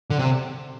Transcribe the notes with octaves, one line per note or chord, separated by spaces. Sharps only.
D3
C3